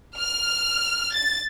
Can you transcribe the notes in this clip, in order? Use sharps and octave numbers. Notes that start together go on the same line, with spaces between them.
F6
A6